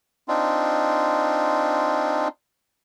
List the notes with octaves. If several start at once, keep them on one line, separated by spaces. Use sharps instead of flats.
C4 D4 D#4 F4